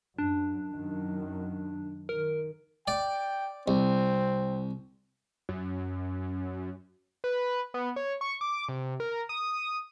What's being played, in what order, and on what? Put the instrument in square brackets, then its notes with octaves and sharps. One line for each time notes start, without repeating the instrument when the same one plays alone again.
[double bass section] F#2 [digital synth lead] D4
[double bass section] F#2 D#3
[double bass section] D#3 [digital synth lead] A#4
[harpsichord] D5 [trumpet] G5
[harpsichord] C2 [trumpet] C4
[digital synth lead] F#2
[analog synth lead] B4
B3
C#5
C#6
D6
C3
A#4
D#6